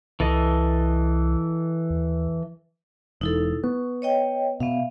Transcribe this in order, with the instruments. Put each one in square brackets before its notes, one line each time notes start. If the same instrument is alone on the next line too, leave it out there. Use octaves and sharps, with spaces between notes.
[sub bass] C2 [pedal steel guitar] E3 A4 D#5
[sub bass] D#2
[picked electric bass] E1 [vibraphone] D#4 E4 A4
[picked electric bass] B3 [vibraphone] C#6
[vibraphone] C#5 D#5 G5
[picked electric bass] B2 [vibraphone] B3 E5 F5